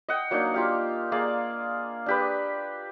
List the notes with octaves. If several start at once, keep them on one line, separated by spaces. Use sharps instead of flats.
D#5 F#5 G5
F#3 A#3 D4 D#4
F4 G4 F5
A#3 G#4 D5 F5
D4 G4 B4